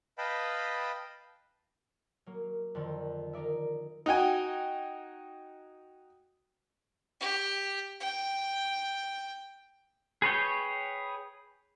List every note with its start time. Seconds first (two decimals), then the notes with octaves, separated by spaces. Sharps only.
0.18 B4 D#5 F5 G5 A5 B5
2.26 F#3 A#3
2.75 F2 D3 D#3
3.33 D#4 A#4 D5 E5
4.06 D#4 F#4 G5 G#5
7.20 G4
8.00 G5
10.22 G#4 B4 C#5 G5